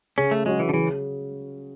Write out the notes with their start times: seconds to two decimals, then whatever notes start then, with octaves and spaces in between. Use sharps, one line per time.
0.17 C#3 C#4
0.31 A3
0.46 F#3 G#3 C#4 F#4
0.59 E3
0.69 D3
0.73 C#3 E3